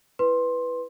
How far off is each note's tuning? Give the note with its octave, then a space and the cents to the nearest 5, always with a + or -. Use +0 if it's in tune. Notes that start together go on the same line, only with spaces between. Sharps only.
E4 +0 B4 +0 C6 +15